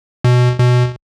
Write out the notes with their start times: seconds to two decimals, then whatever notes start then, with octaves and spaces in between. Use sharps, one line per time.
0.24 B2
0.59 B2